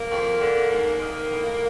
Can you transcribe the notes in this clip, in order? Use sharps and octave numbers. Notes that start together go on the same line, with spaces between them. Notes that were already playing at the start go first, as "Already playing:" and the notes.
Already playing: A#3
F2
D3
G#2 A#3
D#3
A2